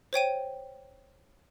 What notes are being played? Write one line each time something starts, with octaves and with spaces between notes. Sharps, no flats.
C5 C#5 G5 D#7